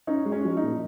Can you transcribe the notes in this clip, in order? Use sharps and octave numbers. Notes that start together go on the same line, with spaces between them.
C#4 D#4
G#3
C#4
F3
D#4
A#2